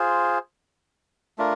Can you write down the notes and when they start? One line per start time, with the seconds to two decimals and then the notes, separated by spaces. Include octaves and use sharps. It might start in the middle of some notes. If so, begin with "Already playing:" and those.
Already playing: F4 G#4 C5
1.38 A3 D4 F4 A#4